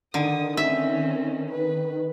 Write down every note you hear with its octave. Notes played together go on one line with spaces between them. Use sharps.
D3 D#3 D#6
C4 C#4 E5
B4